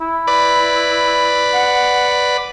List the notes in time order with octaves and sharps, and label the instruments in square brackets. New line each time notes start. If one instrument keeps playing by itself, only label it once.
[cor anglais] E4
[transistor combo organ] B4 D5
[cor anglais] F#5